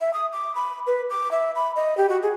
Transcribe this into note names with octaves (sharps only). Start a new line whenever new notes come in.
E5
D#6
D6
B5
B4
D6
E5
B5
D#5
G4
F#4
G#4